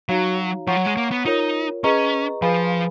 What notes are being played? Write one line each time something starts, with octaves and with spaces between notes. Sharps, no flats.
F#3 D#4 F#4 C#5 F5 A#5
F3 C#5 F#5 A#5 C#6
F#3
G#3
A#3
B3
D#4 F4 A#4 C#5
C#4 G#4 B4 D#5 A#5 C#6
F3 G#4 B4 F5 G#5 B5